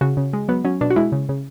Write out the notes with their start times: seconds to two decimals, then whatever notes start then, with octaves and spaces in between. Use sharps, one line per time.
0.01 C#3 F#4
0.17 C#3
0.33 G#3
0.48 F#3 B3
0.64 F#3 C#4
0.81 B2 D4
0.90 F#4
0.96 G#3 E4
1.12 C#3
1.29 C#3